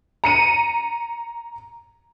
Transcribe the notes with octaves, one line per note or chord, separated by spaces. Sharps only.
A#5 C#7 D#7